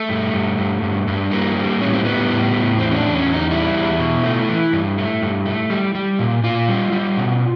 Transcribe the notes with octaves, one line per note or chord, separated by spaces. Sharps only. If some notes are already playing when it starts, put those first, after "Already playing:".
Already playing: A3
G2
G2
G2
G2
G2
G3 A#3
G3
A2 C#4
C4
G3 B3
A2
A2
E2 C4
C#4
D4
E2
C#4
E2
D#4
G3 E4
E2
B2
A3
E3
G2
A3
G2
A3
G3
G3
A#2
A#2 F4
G3
G3
B2